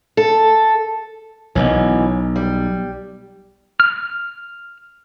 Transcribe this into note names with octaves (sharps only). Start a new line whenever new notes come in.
A4
B1 B2 E3 C#4
G3
F6